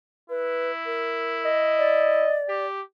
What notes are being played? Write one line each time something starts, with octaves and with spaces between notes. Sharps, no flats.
E4 B4
A#4
D#5
D5
G4